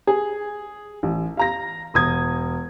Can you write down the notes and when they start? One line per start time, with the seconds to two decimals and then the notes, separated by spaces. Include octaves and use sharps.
0.07 G#4
1.03 A1
1.37 F5 A#5 A#6
1.94 E1 D#6 G#6